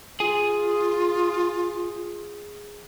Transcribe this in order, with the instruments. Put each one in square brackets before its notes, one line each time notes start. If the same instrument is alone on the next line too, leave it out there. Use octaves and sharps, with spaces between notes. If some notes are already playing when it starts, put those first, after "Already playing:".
[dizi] F4 [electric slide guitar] G#4 G#5